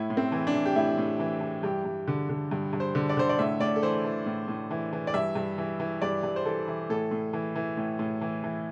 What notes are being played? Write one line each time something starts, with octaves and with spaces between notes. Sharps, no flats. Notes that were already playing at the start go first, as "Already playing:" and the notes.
Already playing: A2 E4
A2
C4
E3
D4
E3
G4
A2 E4
A2
E3
E3
G2 G4
G2
D3
D3
G2
G2
C5
D3
D5
D3 C5
D5
A2 E5
A2 D5
A4
E3 C5
E3
A2
A2
E3
E3
D5
G2 E5
G2
E3
E3
G2 D5
G2
C5
E3 A4
E3
A2 A4
A2
E3
E3
A2
A2
E3
E3